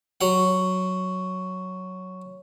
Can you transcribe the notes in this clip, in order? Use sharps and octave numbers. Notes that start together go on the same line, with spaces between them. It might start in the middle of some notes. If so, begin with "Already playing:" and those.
F#3 F#5